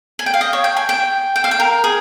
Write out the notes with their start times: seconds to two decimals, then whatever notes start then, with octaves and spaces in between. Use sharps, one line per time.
0.19 G#5
0.26 G5
0.34 F5
0.41 D#5
0.53 C#5
0.64 G5
0.77 G#5
0.89 G5
1.36 G5
1.44 F5
1.51 G5
1.60 A#4
1.84 G#4